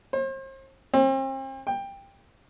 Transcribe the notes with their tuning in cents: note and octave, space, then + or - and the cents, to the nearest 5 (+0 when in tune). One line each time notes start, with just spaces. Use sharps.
C5 +40
C4 +40
G5 +15